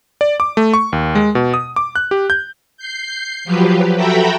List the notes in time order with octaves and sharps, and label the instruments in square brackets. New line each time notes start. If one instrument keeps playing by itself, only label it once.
[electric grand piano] D5
D6
A3
C#6
D#2
G#3
B2
D#6
D6
F#6
G4
G6
[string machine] G6 C7
F3 F#3 G4 B4
F#4 A4 E5 G5 A#5 B5